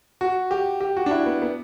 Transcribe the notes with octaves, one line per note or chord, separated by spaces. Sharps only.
F#4
G4
G4
F#4
D4
E4
B3
B3